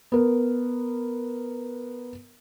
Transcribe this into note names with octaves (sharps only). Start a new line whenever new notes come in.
B3 A#4